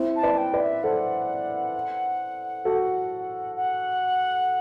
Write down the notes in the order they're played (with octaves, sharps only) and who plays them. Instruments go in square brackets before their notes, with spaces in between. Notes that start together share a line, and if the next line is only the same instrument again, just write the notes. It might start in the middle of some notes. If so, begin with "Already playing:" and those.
Already playing: [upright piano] C4 E4
[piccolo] A5
[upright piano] B4 D5
[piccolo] G5
[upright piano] B4 D5
[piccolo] E5
[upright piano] A4 C5 [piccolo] F#5
[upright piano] F#4 A4
[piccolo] F#5